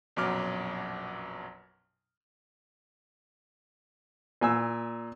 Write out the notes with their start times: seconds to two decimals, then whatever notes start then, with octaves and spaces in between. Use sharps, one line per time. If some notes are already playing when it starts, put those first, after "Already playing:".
0.16 A#1 F#2 B2 F#3 D6 F6
4.41 A#2 G#5 E6